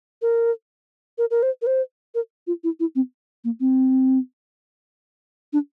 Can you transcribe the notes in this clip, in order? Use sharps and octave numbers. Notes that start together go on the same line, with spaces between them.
A#4
A#4
A#4
C5
A#4
C5
A#4
F4
E4
E4
C4
A#3
C4
D4